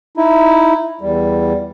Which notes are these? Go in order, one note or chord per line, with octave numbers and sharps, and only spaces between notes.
D#4 E4
E2 G3